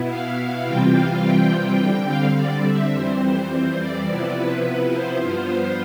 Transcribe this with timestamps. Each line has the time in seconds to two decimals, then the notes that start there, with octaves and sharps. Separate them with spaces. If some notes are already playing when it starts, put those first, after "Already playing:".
Already playing: B2 B3 E4
0.09 F5
0.66 C3 E3 G3 C4 F4 G5
0.94 F5
1.24 G5
1.80 D3 G3 C4
2.08 F5
2.37 D5
2.66 E5
2.93 F2 E3 G3 C4 C5
3.22 C5
3.79 D5
4.08 C3 F3 B3 E4
4.36 B4
4.93 C5
5.21 G2 F3 B3 F4 C5